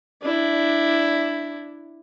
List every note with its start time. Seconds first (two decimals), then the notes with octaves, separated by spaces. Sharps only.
0.22 D4 E4